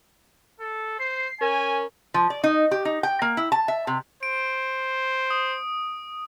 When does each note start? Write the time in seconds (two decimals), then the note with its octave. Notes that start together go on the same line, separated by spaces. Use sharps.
0.60 A4
0.99 C5 C7
1.41 C#4 A#4 G#5
2.14 F3
2.30 D5
2.44 D#4
2.71 G4
2.85 D#4
3.03 G5
3.22 A#3
3.37 E4
3.52 A5
3.68 E5
3.87 C3
4.23 C5 D7
5.30 D#6